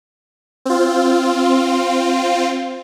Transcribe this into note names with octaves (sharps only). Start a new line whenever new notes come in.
C4 F4